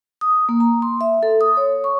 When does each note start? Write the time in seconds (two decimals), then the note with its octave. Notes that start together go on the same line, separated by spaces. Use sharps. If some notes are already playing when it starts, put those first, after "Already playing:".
0.21 D#6
0.49 A#3
0.60 A#5
0.82 C6
1.01 E5
1.23 A4
1.41 D#6
1.57 C#5
1.84 C#6